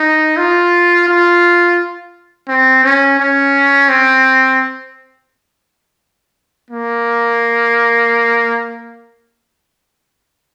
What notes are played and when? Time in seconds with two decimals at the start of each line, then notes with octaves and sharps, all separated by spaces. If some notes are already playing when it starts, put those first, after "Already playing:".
Already playing: D#4
0.37 F4
1.08 F4
2.48 C4
2.84 C#4
3.20 C#4
3.89 C4
6.70 A#3